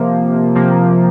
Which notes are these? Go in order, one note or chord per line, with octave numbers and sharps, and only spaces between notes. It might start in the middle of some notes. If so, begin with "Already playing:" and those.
Already playing: C3 F3 A#3
C3 F3 A#3